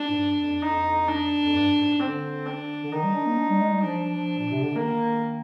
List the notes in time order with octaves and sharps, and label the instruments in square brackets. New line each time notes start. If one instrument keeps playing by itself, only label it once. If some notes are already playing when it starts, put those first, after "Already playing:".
Already playing: [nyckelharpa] D4
[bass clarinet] G#2
G2
F2
[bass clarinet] F2 [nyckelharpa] D#4
[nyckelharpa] D4
[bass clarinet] F2
G2
G#2
[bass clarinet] D3 [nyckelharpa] C4
[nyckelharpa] D4
[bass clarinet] D3
[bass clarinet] D#3 [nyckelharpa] D#4
[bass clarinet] G3
D4
A#3
D4
G3
G#3
G3
[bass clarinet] F3 [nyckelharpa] D4
[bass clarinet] F3
A#2
C3
D3
[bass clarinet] D#3 [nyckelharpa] A#3